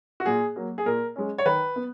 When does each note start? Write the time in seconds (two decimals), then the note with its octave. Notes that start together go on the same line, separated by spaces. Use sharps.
0.20 F#4
0.26 A#2 G#4
0.56 F#3 A#3
0.78 G#4
0.86 A#2 A#4
1.16 G#3 C#4
1.38 C#5
1.46 D#3 B4
1.76 B3